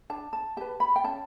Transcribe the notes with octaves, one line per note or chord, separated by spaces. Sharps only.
D4 A5
A5
G4 B4 A5
B5
G5
C#4 A5